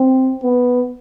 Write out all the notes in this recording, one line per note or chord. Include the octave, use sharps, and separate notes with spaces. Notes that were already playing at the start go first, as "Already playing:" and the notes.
Already playing: C4
B3